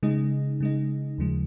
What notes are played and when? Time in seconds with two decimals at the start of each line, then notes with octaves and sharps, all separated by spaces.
0.03 C#3 G#3 D#4
0.60 C#3 G#3 D#4
1.18 D#2 C#3 F3 G#3